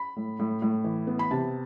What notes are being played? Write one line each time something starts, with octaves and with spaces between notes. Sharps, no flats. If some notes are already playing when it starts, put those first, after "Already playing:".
Already playing: B5
A2
A2
A2
E3
B3
B5
C3 A5